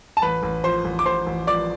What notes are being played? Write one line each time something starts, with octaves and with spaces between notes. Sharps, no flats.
A5
A1 B4 B5
A1
F3 C5 C6
A1
D6
A1 C5 C6
A1
F3 D5 D6